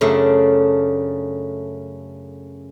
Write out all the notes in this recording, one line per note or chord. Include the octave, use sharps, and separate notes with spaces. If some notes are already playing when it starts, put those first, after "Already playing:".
F#2 C#3 A3 D4